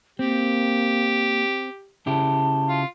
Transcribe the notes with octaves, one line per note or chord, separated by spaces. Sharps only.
A#3 C4 G4
C#3 E4 G4 A5
F4